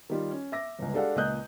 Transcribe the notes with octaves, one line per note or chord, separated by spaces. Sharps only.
D#3 G3 F4
C#4
E5 D6 A#6
G1 C#2
G#3 D4 G4 A4 F5 F#5
C#2 A#2 D#5 D#6 F#6 G6